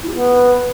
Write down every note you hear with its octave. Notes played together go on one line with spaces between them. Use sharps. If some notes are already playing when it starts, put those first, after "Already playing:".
E4
G4
B3